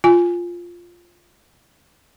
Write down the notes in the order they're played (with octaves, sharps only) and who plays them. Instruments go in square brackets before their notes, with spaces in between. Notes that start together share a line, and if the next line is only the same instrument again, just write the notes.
[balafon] F4 G#5